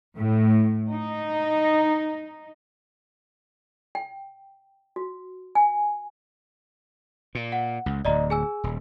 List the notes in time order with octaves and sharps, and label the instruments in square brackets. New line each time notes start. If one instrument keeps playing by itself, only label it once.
[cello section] A2
D#4
[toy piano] G5
F#4
G#5
[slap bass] A#2
[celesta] F#5
[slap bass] C#2
[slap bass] D1 D2 [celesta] D5 D#5 A#5
[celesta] G#4 G#5 E6
[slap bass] D#1